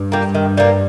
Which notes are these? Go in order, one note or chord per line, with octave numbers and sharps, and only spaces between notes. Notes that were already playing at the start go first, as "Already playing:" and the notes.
Already playing: G2
G3 A#3
D#3
G3 A#3